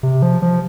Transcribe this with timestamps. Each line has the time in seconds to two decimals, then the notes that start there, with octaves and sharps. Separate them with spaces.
0.03 C3
0.22 F3
0.42 F3